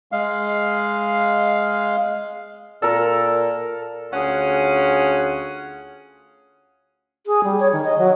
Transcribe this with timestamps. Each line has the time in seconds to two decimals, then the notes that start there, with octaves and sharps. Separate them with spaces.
0.12 G#3 F5
2.82 A#2 A4 A#4
4.11 D2 C#4 F4 G#4 F#5
7.27 G#4
7.44 G3
7.60 C#5
7.73 D#3
7.85 D#5
7.99 F#3